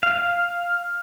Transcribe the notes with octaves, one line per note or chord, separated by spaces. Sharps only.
F5